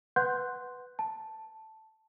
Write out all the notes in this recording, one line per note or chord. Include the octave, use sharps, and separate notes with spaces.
B4 F#5 C6 F#6 G6
A5